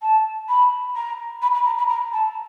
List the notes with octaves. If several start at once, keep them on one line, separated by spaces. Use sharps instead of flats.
A5
B5
A#5
B5
B5
A#5
B5
A#5
A5